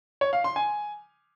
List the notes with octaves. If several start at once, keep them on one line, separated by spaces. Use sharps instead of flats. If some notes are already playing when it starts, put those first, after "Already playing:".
C#5
F5
C6
G#5